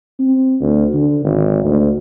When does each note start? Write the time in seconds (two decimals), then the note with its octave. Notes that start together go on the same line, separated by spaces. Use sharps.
0.19 C4
0.61 D2
0.94 D3
1.24 G#1
1.64 D2